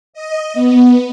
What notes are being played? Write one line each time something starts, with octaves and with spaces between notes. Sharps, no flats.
D#5
B3